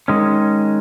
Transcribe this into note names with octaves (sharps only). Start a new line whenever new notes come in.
D#3 G#3 C#4